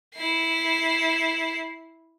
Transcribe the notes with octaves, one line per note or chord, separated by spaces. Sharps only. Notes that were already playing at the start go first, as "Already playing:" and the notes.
E4 C7